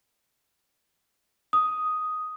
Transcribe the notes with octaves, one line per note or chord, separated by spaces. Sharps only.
D#6